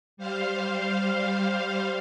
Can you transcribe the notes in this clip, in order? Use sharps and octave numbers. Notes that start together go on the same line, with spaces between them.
G3 C5 F5